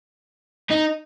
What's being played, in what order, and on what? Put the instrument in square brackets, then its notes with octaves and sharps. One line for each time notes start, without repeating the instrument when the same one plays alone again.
[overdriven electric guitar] D#4